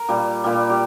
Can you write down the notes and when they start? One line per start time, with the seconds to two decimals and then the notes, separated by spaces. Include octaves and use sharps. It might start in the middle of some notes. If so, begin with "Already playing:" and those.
Already playing: A#4
0.09 A#2 G3
0.44 A#2 G3
0.70 G4